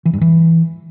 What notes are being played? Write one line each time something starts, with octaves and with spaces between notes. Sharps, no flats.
E3
G2
E3